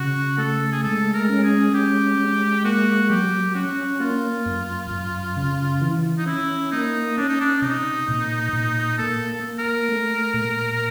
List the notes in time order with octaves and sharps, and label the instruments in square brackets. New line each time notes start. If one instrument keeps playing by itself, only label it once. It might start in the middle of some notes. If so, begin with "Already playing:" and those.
Already playing: [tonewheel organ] C#3 [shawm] F#4
[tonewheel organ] A3 [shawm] A4
[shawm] G#4
[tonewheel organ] G#3 [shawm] A4
[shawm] A#4
[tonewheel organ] C#4
[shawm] G#4
[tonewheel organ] G#3 [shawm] G4
[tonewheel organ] G#3
[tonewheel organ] A#3 [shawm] F#4
[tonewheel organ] F#3 [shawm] G4
[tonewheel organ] C#4 [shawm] F#4
[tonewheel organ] A#3 [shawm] F4
[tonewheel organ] F#2
F#2
C#3
E3
[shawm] D#4
[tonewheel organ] C#4 [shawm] E4
[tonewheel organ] A#3 [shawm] D#4
[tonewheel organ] C#4 [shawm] D4
[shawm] D#4
D4
[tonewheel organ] C3 [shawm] D#4
[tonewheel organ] A#2
A#2
[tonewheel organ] A#3 [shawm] A4
[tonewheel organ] A#3
[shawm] A#4
[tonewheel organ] A3
A#2